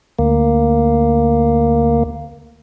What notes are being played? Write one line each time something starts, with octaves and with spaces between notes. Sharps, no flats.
D2 A#3